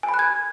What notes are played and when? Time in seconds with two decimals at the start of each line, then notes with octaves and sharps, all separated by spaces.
0.03 G#5
0.09 B5
0.14 F#6
0.19 G#6